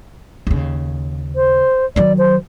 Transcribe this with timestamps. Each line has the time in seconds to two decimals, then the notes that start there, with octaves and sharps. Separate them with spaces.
0.47 D#2 C#3
1.36 C5
1.96 D#3 F#3 D5
2.18 C5